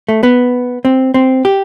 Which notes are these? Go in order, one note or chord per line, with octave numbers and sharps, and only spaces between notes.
A3
B3
C4
C4
G4